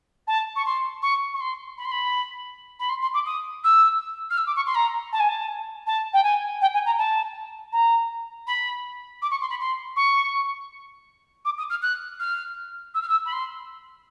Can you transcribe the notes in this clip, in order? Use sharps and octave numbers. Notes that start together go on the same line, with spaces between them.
A5
C#6
C6
C#6
C#6
C6
B5
C6
B5
B5
C6
C6
D6
D#6
E6
F6
E6
D6
C#6
C6
A#5
A5
G#5
A5
A5
G5
G#5
G5
G#5
A#5
A5
A#5
B5
D6
C#6
C6
B5
C6
C#6
D6
D#6
F6
F#6
F6
E6
F6
E6
B5
C6